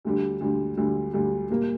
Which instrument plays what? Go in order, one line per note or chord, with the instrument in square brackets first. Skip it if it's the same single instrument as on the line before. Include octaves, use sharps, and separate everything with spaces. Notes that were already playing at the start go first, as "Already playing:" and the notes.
[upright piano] D2 D3 G3
D2 D3 G3
D2 D3 G3
D2 D3 G3
A#2 G3 A#3